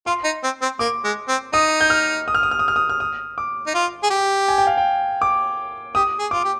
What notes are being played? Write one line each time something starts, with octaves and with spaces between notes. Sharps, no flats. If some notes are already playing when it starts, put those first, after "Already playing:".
F4 C6
D#4
C4
C4
A#3 D6
G#3
C4
D#4 D#6
G6
F6
D#6
F6
D#6
F6
D#6
F6
D#6
F6
D#6
D6
D#4
F4
G#4
G4
G#5
G5
F5
G5
D6
G4 D#6
G#4
F4 D6
G4